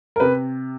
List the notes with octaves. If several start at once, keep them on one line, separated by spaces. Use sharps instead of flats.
A#4
C3 B4